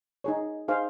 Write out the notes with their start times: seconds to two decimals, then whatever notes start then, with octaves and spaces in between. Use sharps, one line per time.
0.24 D#4 G#4 C#5
0.68 D#4 G#4 C5 F5